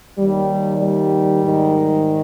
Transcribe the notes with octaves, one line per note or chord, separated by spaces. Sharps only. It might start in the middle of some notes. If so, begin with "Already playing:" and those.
D#2 D#3 G3
G3
G#2 D#3